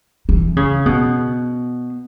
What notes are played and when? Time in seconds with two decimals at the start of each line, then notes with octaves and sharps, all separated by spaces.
0.29 E3
0.56 C#3
0.86 B2